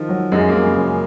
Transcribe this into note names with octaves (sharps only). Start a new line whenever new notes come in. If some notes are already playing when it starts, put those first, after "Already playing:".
Already playing: D#3 F3
F#3
F#2 G#3
A#3
F#2
C#3
F#2